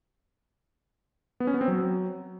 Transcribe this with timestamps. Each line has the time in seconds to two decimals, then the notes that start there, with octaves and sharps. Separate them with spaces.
1.40 B3
1.47 C#4
1.54 B3
1.61 C4
1.68 F#3